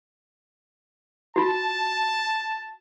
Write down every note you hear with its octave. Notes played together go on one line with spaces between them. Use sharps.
F4 F#4 A5